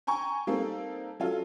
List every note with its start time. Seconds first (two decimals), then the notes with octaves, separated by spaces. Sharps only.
0.07 G5 G#5 A#5 C#6
0.47 G3 A#3 C4 D#4 A4
1.20 F#3 C#4 F4 A4